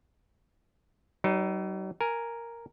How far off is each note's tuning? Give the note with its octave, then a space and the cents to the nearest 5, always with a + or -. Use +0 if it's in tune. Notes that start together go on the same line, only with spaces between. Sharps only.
F#3 +45 D#4 +0 B4 +0
A#4 +0 G#5 +0